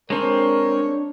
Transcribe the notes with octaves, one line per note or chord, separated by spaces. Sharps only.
G#3 C4 D4 A#4 C#5